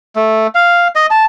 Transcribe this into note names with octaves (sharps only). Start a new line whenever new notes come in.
A3
F5
D#5
A5